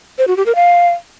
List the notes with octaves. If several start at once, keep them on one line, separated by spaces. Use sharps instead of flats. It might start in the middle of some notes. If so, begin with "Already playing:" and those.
C5
F#4
G4
A#4
F5